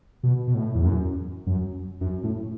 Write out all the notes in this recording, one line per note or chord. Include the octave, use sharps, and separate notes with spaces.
B2
B2
A2
E2
F#2
F#2
F#2
A2